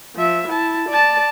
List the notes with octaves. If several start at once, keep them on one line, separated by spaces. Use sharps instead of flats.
F3 E5
E4 A5
D5 A5